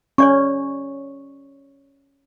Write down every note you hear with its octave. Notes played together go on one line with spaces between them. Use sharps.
C#4 C#5 D5 C#6